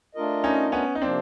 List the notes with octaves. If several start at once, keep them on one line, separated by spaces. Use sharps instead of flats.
A3 D4 F4 A#4 D#5
C#4 D#4
B3 C#4
D#4
C3 F3 A#3 C4 D4